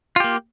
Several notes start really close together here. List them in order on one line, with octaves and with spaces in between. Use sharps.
F4 G4 A#3